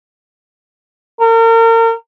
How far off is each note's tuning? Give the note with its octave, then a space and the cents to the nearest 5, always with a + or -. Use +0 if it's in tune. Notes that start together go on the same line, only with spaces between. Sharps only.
A#4 -35